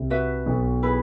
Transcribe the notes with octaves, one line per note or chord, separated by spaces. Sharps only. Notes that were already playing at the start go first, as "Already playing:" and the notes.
Already playing: C2 C3
F#4 B4 E5
B1 B2
E4 G#4 B4